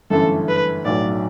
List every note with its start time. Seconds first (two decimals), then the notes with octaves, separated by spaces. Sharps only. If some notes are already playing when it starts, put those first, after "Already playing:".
0.10 G1 F#2 E3 A3 A4
0.48 B4
0.85 B1 A2 F#3 D5